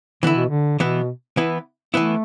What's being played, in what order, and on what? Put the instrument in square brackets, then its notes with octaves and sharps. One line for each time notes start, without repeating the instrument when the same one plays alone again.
[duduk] D3 [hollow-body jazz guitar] E3 B3 E4
[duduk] B2
D3
[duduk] B2 [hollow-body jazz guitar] E3 B3 E4
[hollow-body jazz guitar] E3 B3 E4
[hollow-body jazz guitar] E3 B3 E4 [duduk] A3